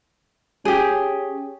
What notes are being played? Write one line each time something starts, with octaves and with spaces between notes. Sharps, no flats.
C#4 G4 G#4